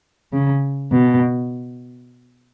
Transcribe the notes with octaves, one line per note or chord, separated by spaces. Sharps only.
C#3
B2